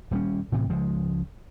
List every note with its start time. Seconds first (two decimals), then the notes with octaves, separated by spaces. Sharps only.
0.11 D#1 G3 C#4
0.52 A2 C3 E3
0.70 C#2 F3 G#3